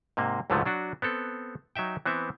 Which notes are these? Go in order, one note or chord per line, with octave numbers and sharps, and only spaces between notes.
G#2 C3 A#3
C#2 G#2 D3 F3 F#3 A3
F#3 D4 F#4
B3 C4 A4
F#3 D#4 E5 G5
E3 B3 C4 E5